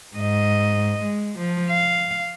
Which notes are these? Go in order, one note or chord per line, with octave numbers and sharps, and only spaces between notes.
G#2 D#5
G#3
F3
F5